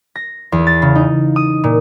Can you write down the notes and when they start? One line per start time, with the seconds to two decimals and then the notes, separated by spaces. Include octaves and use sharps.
0.16 A#6
0.52 E2
0.67 A6
0.82 C#3
0.95 D#4
1.36 D#6
1.64 A#2